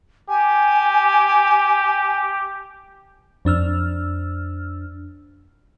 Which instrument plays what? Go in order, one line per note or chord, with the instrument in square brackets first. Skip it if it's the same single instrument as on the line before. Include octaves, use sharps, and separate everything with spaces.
[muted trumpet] G4 [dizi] G#5
[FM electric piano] F2 D4 E6 F6